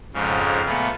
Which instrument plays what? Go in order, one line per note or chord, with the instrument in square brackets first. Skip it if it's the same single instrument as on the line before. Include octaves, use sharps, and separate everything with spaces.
[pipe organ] F2 G#2 C#3
A#2 A3 B3